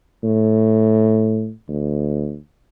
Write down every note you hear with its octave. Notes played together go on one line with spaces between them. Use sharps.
A2
D2